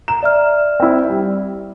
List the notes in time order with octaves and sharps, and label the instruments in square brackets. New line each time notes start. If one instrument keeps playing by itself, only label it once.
[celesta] A#5 [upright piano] E7
[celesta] D5 E5 F6
[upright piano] C4 E4
G3